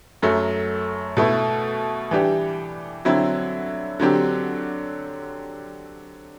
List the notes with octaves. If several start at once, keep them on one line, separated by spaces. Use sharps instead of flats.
F#2 F#3 A3
B2 A3 E4
E3 G3 D4 G4
D3 F#3 C4 E4
D3 F#3 C4 G4